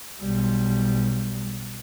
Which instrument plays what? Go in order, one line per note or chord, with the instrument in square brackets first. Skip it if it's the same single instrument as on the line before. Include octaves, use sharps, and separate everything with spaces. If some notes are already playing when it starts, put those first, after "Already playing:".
[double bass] B1 G3